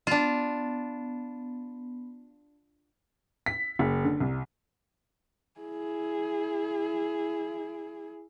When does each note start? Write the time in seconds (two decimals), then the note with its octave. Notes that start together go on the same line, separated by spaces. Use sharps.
0.07 B3 D4 F4
3.46 B6
3.79 F#1
4.05 D3
4.20 C2
5.60 E4 G#4